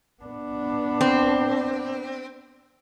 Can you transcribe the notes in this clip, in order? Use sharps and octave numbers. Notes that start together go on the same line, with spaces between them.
B3 D4
C4